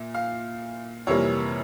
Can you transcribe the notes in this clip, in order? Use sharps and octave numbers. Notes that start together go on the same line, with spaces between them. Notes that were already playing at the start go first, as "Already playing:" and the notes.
Already playing: A#2 E5
F5
F2 C3 E3 G3 A#3 C#5